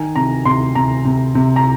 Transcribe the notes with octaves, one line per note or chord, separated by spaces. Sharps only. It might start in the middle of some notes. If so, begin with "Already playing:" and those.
Already playing: D#3 G#5
C3 A#5
C3 C6
C3 A#5
C3
C3
A#5